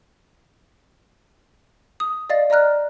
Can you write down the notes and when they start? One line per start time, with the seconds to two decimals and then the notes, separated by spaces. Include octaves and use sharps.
2.00 D#6
2.30 D5 D#5 F5 A6
2.50 D5 D#5 A#5 F6 F#6